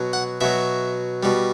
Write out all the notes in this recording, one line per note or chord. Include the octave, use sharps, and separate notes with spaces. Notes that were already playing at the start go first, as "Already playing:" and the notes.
Already playing: B2 F#3
F#5
B2 F#3 E5
B2 G3